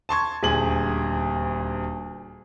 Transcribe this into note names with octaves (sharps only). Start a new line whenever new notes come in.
A5 C6 C#6 G#6
D#1 D2 G#4 F#7